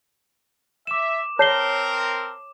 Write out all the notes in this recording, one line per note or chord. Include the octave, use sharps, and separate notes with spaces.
E5 D6 E7
C4 A#4 C#5 A5 C7 G7